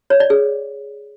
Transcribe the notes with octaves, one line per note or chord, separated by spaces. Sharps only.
C#5
D5
G#4